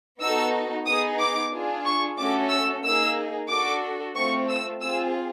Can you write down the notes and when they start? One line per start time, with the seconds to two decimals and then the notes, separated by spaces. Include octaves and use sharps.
0.20 B3 D#4 F#4 A4 E6
0.86 B3 D#4 G#4 D#6
1.19 D6
1.52 D4 F4 G#4
1.85 C#6
2.18 A3 C#4 F#4 A4 D6
2.51 E6
2.84 A#3 D#4 G#4 E6
3.49 D4 F#4 A4 D6
4.15 A3 C4 F4 C#6
4.49 E6
4.82 C4 F4 G#4 E6